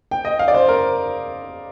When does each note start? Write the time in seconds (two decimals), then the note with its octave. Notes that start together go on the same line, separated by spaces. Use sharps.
0.11 G5
0.25 D#5
0.39 F5
0.48 D5
0.54 C5
0.68 A#4